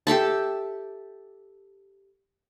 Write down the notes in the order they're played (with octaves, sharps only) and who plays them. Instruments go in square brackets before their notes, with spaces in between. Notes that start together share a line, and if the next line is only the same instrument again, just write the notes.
[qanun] G4 A4 E5 A5